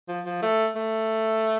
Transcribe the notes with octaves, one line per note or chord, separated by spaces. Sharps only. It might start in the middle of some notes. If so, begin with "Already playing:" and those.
F3
F3
A3
A3